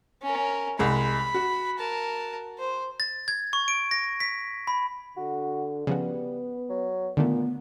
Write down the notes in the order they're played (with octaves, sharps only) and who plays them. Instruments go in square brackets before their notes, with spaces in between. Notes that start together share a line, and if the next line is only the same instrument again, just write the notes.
[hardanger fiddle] C#4 A#4
[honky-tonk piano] C2 G#3 [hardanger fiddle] B5
[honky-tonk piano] F#4
[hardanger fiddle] A#4 A5
C5
[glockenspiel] A6
G#6
C#6
D7
A#6
B6
B5
[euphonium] D3 [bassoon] F#4
[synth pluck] C#3 F3 F#4 [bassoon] G3 [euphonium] B3
[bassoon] F#3
[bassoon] A#2 [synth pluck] D3 D#3 A3 [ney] B3